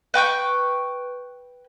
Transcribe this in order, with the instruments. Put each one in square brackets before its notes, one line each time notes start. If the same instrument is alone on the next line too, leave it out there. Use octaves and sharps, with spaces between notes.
[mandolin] B4 G5 C#6 G6